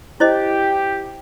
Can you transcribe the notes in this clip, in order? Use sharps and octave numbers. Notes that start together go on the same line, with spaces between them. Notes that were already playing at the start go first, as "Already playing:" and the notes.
E4 G4 C5 D#5